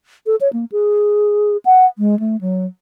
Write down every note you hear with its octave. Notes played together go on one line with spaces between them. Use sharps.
A4
C#5
A#3
G#4
F#5
G#3
A3
F#3